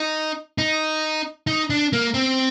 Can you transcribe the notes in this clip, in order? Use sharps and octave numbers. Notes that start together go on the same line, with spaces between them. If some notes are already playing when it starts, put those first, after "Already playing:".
Already playing: D#4
D#4
D#4
D4
A#3
C4